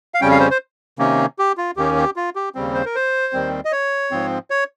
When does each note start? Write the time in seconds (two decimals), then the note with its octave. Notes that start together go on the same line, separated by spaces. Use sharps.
0.14 F5
0.21 F2 C#3 G3 C#4 G5
0.31 F5
0.40 C5
0.51 C5
0.99 C3 D#3 A#3 C#4
1.39 G4
1.57 F4
1.77 D#2 D#3 A#3 C#4 G4
1.97 G4
2.16 F4
2.36 G4
2.55 D#2 C#3 G3 C4
2.74 C5
2.85 A#4
2.95 C5
3.33 D#2 D#3 G3 C4
3.65 D#5
3.72 C#5
4.11 G#2 F3 C4
4.50 C#5